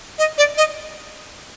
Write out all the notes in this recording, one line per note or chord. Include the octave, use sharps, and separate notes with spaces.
D#5
D5
D#5